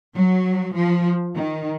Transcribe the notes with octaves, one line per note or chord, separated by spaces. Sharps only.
F#3
F3
D#3